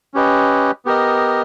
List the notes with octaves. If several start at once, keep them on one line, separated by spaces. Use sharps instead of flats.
C#4 G4 B4 D#5
B3 G4 A#4 D#5